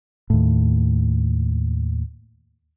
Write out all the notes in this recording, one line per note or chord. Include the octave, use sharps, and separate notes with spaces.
D#2 A2